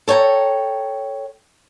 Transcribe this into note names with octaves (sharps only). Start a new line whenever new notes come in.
A4 C#5 G5 G#5 A#5